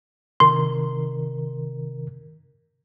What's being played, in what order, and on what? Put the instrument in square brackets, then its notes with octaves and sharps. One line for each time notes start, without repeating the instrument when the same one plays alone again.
[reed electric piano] C3 D#3 A#4 [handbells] C6